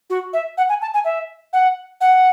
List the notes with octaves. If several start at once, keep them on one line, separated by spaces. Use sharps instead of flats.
F#4
E5
F#5
G#5
A5
G#5
E5
F#5
F#5